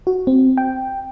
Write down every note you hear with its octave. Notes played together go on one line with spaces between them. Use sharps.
F#4
C4
G5